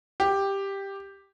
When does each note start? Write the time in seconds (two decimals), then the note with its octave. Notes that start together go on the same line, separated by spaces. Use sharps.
0.20 G4